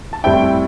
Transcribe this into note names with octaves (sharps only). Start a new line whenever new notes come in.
A5
A2 G3 C4 E4 G5